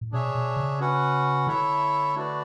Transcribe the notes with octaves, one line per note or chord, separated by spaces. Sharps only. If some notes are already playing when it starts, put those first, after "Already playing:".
A2
B2 D4 G#4 C#5 E5
B2
C#3
C#4 F#4 B4 F#5
D3 E4 A4 C#5 E5
A3 D4 F#4 B4 D5